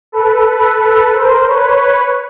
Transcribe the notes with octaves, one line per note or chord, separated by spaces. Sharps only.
A4 B4
A4 B4
A4 B4
A#4 C5
B4 C#5